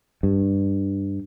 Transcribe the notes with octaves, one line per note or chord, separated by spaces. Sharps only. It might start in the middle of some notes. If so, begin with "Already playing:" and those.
G2